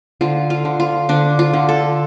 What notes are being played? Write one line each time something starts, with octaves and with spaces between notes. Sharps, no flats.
D3 F4
F4
D3
F4
D3 D4
F4
D3
A4